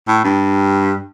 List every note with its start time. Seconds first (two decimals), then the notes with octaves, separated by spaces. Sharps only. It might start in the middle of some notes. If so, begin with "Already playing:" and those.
0.08 A2
0.24 G2